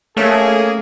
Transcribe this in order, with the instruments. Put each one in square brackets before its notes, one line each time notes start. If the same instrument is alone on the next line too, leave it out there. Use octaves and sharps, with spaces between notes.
[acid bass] A3 [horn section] A#3 C#4 G#4